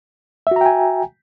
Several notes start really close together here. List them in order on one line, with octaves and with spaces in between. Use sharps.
E5 F#4 A#5 G5 G#5